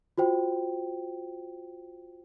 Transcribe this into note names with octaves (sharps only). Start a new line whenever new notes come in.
F4 F#4 C5 G5